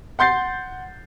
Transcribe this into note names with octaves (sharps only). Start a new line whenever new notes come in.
F#5 C6 G6 A6 C7